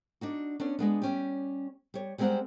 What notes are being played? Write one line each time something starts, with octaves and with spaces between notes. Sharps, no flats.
D4 D#4 F#4
B3 C#4 D4
G#3 B3 D4
G3 C#4 G4
G3 C#5
G3 G#3 B3 C4 A#4 F#5